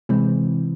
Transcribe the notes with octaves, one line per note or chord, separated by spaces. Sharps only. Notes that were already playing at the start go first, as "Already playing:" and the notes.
C3 E3 G#3 C4